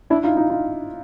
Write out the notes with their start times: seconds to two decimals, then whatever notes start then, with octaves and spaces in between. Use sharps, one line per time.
0.10 D4 E4
0.24 D#4 F4
0.37 D#4 F4
0.50 D#4 F4